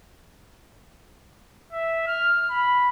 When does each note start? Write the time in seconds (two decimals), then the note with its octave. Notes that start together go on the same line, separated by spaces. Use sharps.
1.73 E5
2.07 F6
2.50 B5